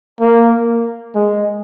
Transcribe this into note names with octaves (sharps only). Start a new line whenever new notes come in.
A#3
G#3